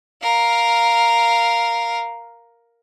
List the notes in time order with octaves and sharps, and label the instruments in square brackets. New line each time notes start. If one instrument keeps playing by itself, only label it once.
[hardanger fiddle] A#4 F5